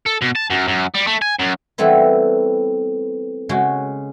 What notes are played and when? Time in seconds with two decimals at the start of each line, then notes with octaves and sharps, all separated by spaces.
0.06 A4
0.22 B2
0.36 A5
0.50 F#2
0.68 F#2
0.94 G3
1.07 A3
1.22 G#5
1.40 F#2
1.78 E3 G3 A3 B3 C4 E4
3.49 C#3 G#3 F#4